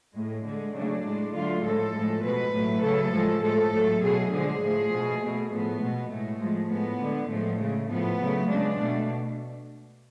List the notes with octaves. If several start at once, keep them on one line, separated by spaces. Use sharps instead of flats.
A2 G#3
D3 G#3
C#3 F#3 A3 D4
A2 G#3
D3 F#3 A3 F4
A2 F3 G#3 A4
A2 F3 G#3
B2 G#3 B4
A2 F#3 A3
C#3 F#3 A3 A4
A2 F3 G#3
A2 F3 G#3 A4
A2 F#3 A3
B2 F#3 A3 G#4
D3 F3 G#3 G#4
A2 F3 A3
B2 A3
B2 A3
A2 F3 A3 B3
B2 G#3
A2 G#3 A3
A2 F3 G#3
A2 G#3 B3
D3 G#3
A2 F3 G#3 A3
C#3 G#3
A2 F3 A3 B3
C#3 F#3 A3
C#3 G#3 D4
B2 A3